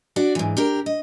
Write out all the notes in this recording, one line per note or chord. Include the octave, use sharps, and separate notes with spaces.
D4 F#4 D5
G#2 E3
D4 G4 A#4
D#5